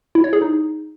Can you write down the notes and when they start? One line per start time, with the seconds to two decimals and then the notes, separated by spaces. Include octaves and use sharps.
0.15 E4
0.24 C#5
0.33 G#4
0.42 D#4